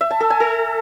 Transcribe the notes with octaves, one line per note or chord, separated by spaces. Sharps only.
E5
A5
A4
G#5
A4